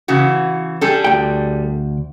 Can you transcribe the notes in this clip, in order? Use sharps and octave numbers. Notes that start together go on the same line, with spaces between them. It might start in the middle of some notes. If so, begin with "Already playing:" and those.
C#3 E3 F#4
G3 G#4 A4
D2 G5